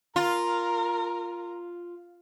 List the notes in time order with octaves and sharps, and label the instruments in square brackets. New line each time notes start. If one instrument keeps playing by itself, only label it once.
[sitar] F4 [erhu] A#4